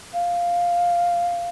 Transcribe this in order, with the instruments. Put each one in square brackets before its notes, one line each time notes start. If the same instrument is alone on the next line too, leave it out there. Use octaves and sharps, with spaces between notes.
[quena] F5